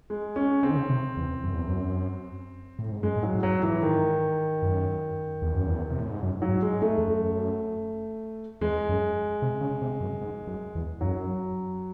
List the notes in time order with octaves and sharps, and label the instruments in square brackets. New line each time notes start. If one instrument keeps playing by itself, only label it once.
[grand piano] G#3
C#4
[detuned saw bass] C#3 [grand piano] C4
[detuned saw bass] D#3
C#3
C3
E2
F#2
E2
F#2
A2
G#2
[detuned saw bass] F#2 [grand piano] G#3
[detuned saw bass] A2
[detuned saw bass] G#2 [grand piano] F#3
[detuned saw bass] A2
[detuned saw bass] G#2 [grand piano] F#3
[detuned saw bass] G#2 [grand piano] E3
[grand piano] D#3
[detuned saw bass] F#2
E2
F#2
E2
C3
A2
G#2
F#2
[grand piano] F#3
[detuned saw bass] G#2
[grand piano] G#3
A3
[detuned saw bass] E2
F#2
[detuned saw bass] E2 [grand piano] G#3
[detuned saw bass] F#2
C3
C#3
C3
F#2
G#2
F#2
E2
[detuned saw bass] F#2 [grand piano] F#3